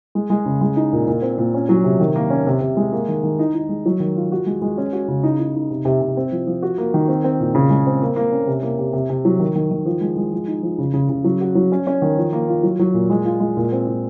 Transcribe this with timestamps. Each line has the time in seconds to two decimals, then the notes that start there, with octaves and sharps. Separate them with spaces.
0.15 G#3
0.30 G#3
0.46 C#3
0.61 G#3
0.76 D#4
0.93 A#2
1.08 A#2
1.22 C4
1.38 A#2
1.54 C#4
1.69 F#3
1.84 C3
2.00 D#3
2.16 A#3
2.30 C#4
2.47 C3
2.61 C3
2.77 G#3
2.92 A#3
3.08 D#3
3.23 D#3
3.39 D#4
3.55 D#4
3.69 G#3
3.86 F#3
4.00 D#3
4.16 F4
4.32 F#4
4.46 G#3
4.62 G#3
4.78 C#4
4.93 F#4
5.08 C#3
5.23 D#4
5.40 D#4
5.55 D#4
5.71 C3
5.85 C3
6.01 C3
6.17 C4
6.32 F3
6.47 F3
6.62 F#4
6.78 A#3
6.94 D#3
7.08 C4
7.24 C4
7.40 A#2
7.55 C#3
7.70 G#3
7.86 C4
8.02 A#3
8.16 A#3
8.32 C#4
8.47 C3
8.63 A#3
8.79 C3
8.93 C3
9.10 C3
9.25 F#3
9.39 D#3
9.56 D#3
9.71 D#3
9.86 F3
10.01 G#3
10.17 G#3
10.33 F3
10.48 D#4
10.63 F3
10.78 C#3
10.94 C#3
11.09 C#3
11.24 F#3
11.41 F#4
11.55 F#3
11.72 C#4
11.87 C#4
12.02 D#3
12.17 F3
12.33 A#3
12.48 F4
12.63 F#3
12.80 F#3
12.94 A#2
13.10 G#3
13.25 F4
13.40 G#3
13.57 A#2
13.72 C4
13.87 A#2